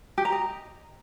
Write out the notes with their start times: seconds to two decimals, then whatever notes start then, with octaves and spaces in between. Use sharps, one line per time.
0.18 G4
0.25 A#5
0.32 D#5